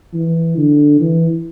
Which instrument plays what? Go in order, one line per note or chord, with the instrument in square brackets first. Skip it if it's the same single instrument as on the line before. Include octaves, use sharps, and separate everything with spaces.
[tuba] E3
D3
E3